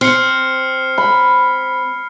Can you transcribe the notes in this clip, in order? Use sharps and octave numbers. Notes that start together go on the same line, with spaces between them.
C4 F6 C7 C#7
B5